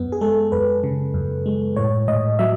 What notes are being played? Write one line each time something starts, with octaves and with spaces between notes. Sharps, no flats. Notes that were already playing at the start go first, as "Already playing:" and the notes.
Already playing: F#2 B3
G#4
G#3 A4
F#2 B4
C#3
F#2
G#3
A2 C#5
A2 D#5
F#3 E5